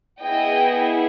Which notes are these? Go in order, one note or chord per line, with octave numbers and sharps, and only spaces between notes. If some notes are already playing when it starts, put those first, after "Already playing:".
B3 E4 G#4 D#5 G5